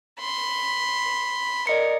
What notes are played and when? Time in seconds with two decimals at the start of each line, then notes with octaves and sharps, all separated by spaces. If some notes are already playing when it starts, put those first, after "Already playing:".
0.20 B5 C6
1.67 A#4 D5 D#5 C#7